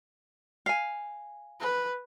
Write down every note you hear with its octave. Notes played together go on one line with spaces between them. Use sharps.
F5 G#5
B4